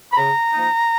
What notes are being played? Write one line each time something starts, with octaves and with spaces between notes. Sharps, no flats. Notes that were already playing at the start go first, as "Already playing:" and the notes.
B5
C#3 A#5
F3 A#3 D#4